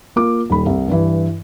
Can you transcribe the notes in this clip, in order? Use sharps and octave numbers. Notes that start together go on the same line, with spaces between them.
A#3 F4 D6
D#1 D#3 B5
C2
G2 E3